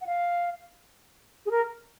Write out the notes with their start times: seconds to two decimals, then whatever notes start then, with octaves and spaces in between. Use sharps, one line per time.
0.01 F#5
0.06 F5
1.46 G#4
1.51 A#4